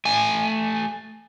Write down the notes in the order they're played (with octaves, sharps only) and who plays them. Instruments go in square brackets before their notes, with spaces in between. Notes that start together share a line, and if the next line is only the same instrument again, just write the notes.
[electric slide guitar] A3 G#5